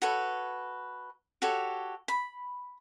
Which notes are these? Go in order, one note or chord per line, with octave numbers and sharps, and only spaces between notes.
F#4 A4 B4 C#5
F#4 G4 A4 C#5
B5